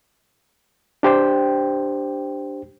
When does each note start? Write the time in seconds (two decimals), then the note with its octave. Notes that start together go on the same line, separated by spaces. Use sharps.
1.03 D4 G4 C5 G5